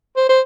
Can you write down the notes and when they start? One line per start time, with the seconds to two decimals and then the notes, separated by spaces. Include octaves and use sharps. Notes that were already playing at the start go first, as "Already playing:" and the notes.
0.17 C5
0.29 C5